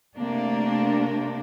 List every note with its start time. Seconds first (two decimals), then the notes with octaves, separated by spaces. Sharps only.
0.16 C3 A3 A#3 D4